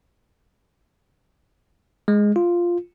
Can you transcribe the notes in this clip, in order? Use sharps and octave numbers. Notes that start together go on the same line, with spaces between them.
G#3
F4